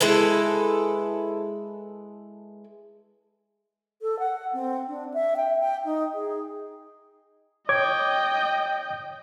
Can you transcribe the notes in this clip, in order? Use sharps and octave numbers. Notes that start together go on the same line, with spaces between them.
G#3 E4 A4 B4
A4
F#5
C4
D4
E5
G5
G5
D#4
G#4
C#5 D#5 G5 D6 G#6